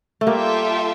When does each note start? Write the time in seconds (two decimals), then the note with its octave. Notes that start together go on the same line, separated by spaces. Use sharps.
0.21 A3
0.27 G3 A#3 F4 A4 E5 G5